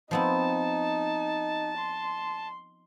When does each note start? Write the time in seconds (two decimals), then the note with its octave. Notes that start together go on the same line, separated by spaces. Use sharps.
0.11 F3 B3 C4 D#4 A5
1.78 C6